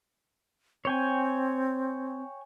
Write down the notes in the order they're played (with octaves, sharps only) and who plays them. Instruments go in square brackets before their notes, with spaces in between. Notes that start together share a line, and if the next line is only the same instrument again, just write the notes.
[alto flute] C4 [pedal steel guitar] C#5 G5 G#5